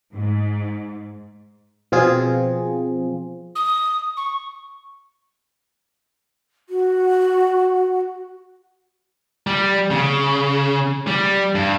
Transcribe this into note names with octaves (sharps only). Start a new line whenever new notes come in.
G#2
B2 F3 C4 F4 G#4
D#6
C#6
F#4
G3
C#3
G3
G2